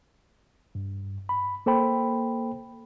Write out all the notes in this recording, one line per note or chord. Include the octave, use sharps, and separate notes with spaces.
G2
B5
A#3 A4 C5 G5 B5